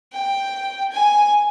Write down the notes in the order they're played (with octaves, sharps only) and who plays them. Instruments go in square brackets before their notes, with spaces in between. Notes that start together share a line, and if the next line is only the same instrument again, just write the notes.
[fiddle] G5
G#5